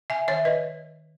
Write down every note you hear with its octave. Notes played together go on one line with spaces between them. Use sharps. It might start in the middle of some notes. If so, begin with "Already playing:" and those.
E5 G#5
D#3 C#5 E5
B4 D#5